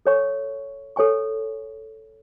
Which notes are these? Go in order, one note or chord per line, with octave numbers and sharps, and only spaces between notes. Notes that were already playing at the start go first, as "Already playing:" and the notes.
A4 C#5 G#5 C#6
A4 C#5 G#5 C#6